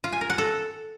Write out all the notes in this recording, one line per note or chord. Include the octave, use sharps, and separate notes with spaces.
F4
G#5
A#4
F#5
A4